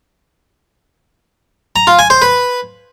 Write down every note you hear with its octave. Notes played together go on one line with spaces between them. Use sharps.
A#5
F4
G#5
C5
B4